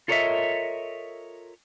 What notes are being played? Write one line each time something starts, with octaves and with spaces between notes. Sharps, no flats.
F4 A4 A#4 C#5 D#5 E5